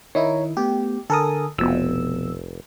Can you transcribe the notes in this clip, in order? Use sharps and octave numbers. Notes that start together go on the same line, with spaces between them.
D#3 D#4 E4 C#5 A#5
A3 B3 G4
D3 A4 A#4 G#5 D#6
F1 B1 B2 F3 E6